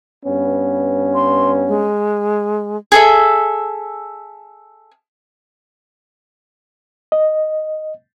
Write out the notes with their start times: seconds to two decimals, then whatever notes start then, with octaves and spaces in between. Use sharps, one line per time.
0.25 G2 B3 C#4
1.15 C6
1.68 G#3
2.92 G#4 A4 E5
7.12 D#5